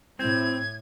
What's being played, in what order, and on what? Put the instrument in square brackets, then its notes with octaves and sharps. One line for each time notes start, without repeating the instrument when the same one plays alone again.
[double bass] A2 [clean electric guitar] C4 [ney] E4 [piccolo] G#6